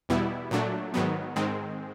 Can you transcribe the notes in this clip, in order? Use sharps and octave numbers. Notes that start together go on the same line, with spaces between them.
E2 B2 G3 B3 E4
A#2 F#3 A3 D4
G#2 D#3 F#3 B3
G#2 D#3 G#3 C4